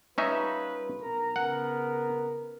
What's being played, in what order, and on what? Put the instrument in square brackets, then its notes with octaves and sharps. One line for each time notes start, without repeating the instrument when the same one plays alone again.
[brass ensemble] G3 F4 B4 [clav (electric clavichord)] C#4 D#4 E5
[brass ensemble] B1 A#4 A#5
[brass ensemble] C#3 B3 A#4 [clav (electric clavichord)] F#5